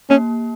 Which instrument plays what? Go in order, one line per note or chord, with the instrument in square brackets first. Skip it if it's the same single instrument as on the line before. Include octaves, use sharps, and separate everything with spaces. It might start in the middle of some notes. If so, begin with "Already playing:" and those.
[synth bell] A#3 [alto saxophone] C#4